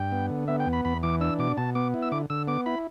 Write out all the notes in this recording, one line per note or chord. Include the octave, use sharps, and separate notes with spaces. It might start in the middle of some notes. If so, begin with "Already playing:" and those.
Already playing: G2 G5
B3
D3
B3 E5
G5
E2
B5
E2 B5
E3 D6
D4 E6
B2 D6
B2 A5
B3 D6
E4
E6
D3 D6
D3 E6
B3 D6
E4 B5